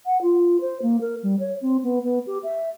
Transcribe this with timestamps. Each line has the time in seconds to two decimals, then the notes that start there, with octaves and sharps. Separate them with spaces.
0.06 F#5
0.22 F4
0.61 C5
0.82 A#3
1.01 A#4
1.23 G3
1.39 C#5
1.62 C4
1.84 B3
2.04 B3
2.27 G4
2.44 E5